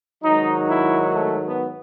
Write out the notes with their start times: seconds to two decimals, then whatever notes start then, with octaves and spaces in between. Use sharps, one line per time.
0.23 G#2 D#3 F#3 D#4
0.69 E4
1.15 A3
1.46 B3